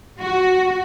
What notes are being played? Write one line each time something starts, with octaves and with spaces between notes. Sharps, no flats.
F#4